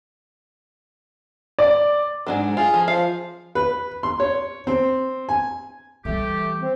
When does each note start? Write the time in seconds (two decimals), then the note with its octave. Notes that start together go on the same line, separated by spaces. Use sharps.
1.59 D5
2.27 G#2 F#3 D4 G#4
2.57 F4 G#4
2.74 F3
2.88 F3 F5
3.55 B4
4.03 C6
4.20 C#5
4.67 C4
5.29 G#5
6.05 E3 G3 A3 G4
6.61 C4